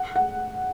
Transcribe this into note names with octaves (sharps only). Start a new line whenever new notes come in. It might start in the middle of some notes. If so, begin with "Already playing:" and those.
Already playing: F#5
F#5